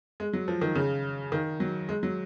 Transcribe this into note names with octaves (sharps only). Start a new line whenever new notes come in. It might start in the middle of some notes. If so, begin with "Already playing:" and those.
G#3
F#3
F3
D#3
C#3
D#3
F#3
G#3
F#3